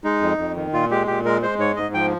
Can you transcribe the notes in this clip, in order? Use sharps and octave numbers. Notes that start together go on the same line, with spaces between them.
G#3 D#4
F2
F2
D#3
A#2 F4
G#3 G4
A#2 G4
G#3 A#4
G#3 C5
G#2 C#5
G#2 D#5
F3 G5